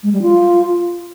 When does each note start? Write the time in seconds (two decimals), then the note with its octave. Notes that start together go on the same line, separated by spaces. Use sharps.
0.03 G#3
0.13 G3
0.22 F4